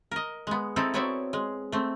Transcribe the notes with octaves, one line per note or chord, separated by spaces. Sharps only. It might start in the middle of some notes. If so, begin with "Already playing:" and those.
A#4 D#5
G#3 B3
C4 D#4 E4 A4
F#3 B3 C4 C#5 D5 E5
G#3
A3 C4